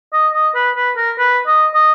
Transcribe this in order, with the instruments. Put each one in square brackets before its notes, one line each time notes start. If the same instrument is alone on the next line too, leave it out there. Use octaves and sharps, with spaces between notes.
[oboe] D#5
D#5
B4
B4
A#4
B4
D#5
D#5